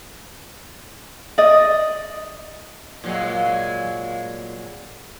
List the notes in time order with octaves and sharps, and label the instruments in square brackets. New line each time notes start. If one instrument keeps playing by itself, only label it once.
[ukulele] D5 D#5
[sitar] A#2 F#3 G#3